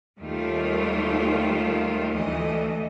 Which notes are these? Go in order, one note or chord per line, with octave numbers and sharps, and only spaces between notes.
D#2 D#3 G3 A3 F4
D2 E3 A3 D#5